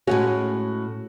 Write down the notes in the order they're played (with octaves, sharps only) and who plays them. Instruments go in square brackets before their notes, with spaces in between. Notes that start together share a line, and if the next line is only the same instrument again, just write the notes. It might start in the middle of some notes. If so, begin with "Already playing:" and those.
[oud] A2 G#3 C#4 [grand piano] F#4